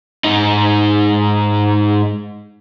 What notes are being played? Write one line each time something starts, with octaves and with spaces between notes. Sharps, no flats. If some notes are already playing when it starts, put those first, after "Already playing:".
G#2 D#4